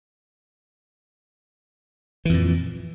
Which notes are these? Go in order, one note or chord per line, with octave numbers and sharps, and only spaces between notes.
F2 A#2 E3